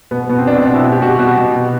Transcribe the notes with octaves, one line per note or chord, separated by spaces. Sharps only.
B2 B3
B2 B3
C4
B2 D4
C4
B2 D4
E4
B2
G4
B2 F#4
G4
B2 F#4
B2
B2